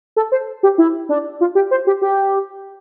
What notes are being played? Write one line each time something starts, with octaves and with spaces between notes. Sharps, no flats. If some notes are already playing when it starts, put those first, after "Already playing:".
A4
C5
G4
E4
D4
F4
G4
C5
G4
G4